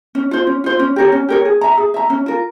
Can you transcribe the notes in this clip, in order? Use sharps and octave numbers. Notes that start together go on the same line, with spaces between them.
C#4
F4 C5
C#4
F4 C5
C#4
G4 A#4 C#5
C#4
G4 A#4 C#5
G#4
E5 A#5
G#4
E5 A#5
C#4
F4 A#4